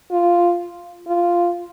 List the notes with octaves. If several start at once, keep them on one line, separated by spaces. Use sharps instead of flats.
F4
F4